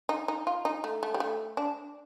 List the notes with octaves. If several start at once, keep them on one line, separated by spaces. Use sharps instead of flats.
D#4
D#4
F4
D#4
A3
A3
G3
A3
D4